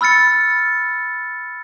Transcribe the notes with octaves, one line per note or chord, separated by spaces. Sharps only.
B5 E6 F6 A6 C#7